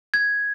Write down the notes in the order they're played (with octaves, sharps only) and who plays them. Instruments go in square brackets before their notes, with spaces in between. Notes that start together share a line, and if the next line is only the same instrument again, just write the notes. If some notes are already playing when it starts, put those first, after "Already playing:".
[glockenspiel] G#6